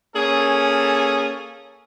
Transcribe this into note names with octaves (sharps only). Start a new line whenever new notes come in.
A#3 C#4 G#4 A4